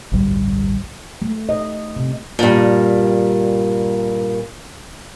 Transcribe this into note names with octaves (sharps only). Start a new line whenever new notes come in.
A1 D2 G2 G3
A3
D#5
C3
G2 A#2